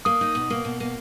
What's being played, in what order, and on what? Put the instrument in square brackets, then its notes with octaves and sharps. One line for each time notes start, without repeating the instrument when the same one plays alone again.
[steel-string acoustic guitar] A#3 [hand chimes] D#6
[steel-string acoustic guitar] D#4
B2
A#3
B2
A#3